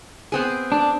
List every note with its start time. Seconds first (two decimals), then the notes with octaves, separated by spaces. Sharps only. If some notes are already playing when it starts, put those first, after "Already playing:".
0.32 B3 C4 G#4
0.72 D4